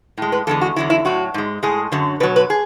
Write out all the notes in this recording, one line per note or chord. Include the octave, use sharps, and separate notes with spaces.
A2 G#3
B4
E2 D3 G#3 A4
F#4
E2 D3 F#3 E4
E4
A2 F#3 F#4
G#2 G#3
A2 G#3 G#4
F#2 D3 F#3
B2 F#3 B4
B4
G#4